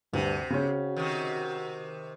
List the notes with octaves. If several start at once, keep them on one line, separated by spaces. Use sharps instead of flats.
D2 G2 C3
C#3 C#4 F#4
C3 D#3